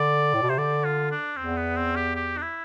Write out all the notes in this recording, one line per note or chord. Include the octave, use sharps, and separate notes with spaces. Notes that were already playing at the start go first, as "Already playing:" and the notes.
Already playing: D3 D5
A2
B2
C3 C5
D3 D5
F4
D4
E2 C4
B3
C4
G4
G4
D4
E4